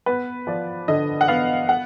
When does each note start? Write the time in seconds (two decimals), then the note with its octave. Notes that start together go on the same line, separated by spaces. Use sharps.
0.06 B3 B4
0.47 F3 D5
0.88 D3 D#5
1.21 F#5
1.28 B3 F5
1.69 F#5